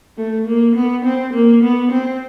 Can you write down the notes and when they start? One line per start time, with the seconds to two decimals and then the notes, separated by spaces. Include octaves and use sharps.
0.17 A3
0.47 A#3
0.76 B3
1.04 C4
1.34 A#3
1.63 B3
1.92 C4